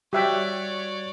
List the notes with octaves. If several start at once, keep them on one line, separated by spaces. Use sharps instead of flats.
G3 F#4 G4 C#5 D5 E5 G5 F#6